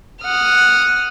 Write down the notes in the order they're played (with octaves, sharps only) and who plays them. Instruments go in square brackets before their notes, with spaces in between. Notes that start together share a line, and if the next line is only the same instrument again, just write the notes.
[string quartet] F#5 D#6 F6